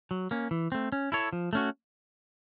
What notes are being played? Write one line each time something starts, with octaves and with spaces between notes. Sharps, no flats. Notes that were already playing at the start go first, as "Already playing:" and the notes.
F#3
A#3 C#4
E3
A3 C4
C#4
E4 A4 C#5
F3
A3 C#4 F#4